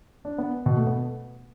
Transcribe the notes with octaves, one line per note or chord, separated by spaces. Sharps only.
D4
B3
B2
A3
B3